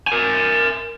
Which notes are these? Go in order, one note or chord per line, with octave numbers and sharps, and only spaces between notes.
A#4 G#5